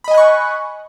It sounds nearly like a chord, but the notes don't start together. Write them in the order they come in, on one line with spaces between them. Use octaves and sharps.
B5 D#5 G#5 F#6 C#6